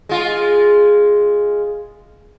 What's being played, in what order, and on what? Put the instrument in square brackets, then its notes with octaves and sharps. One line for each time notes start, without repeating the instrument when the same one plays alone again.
[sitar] G#3 F4